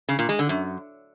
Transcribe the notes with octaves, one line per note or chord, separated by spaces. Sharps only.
C#3
A#2
G#3
D3
F#2